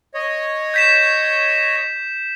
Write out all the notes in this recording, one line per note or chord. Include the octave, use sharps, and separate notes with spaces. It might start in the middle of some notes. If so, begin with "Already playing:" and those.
C#5 D#5
G6 B6 E7